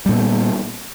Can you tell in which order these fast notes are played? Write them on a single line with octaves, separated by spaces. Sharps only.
G3 A#2 B3